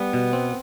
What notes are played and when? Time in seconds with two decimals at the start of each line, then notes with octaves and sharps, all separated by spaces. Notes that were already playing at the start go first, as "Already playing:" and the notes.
Already playing: G3 B3
0.13 B2
0.33 C4